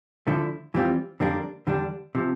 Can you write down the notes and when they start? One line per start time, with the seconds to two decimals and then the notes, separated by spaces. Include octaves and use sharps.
0.27 D2 D3 F3 A3 E4
0.74 F2 E3 G3 C4 F4
1.20 F2 D3 G3 A#3 D4
1.67 E2 D3 G3 D4
2.15 C3 F3